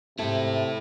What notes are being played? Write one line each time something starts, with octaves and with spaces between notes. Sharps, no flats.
G#2 C3 E4 A4 E5